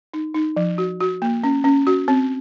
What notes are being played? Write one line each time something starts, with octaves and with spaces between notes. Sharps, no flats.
D#4
D#4
F3
F#4
F#4
A#3
C#4
C#4
F#4
C4